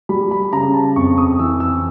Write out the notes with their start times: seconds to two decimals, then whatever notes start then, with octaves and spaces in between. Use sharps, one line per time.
0.09 G3 B5
0.31 B5
0.53 C#3 A#5
0.74 A5
0.96 F2 C#6
1.18 D#6
1.39 E3 E6
1.60 E6